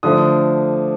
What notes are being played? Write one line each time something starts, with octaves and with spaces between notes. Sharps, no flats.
D3 F3 A3 D#6